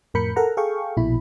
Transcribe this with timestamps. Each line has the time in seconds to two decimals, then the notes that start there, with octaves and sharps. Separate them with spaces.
0.14 F2 A2 A#4 B5 G6 C#7
0.36 A4 A#4 F#5 A#5
0.57 G#4 A4 F5 G5 C#6
0.97 A#1 B2 E4 B5